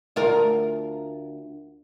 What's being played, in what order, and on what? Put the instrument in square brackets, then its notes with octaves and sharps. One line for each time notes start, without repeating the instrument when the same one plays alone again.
[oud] D2 F4 A#4